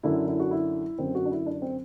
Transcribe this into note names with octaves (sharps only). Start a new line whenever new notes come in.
F#2 D3 E4
E4
F#4
E4
F#2 D3 C4
F#4
D4
E4
D4
C4